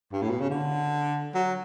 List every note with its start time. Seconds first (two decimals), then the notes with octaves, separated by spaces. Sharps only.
0.12 G2
0.22 A2
0.30 B2
0.41 C#3
0.50 D3
1.35 F#3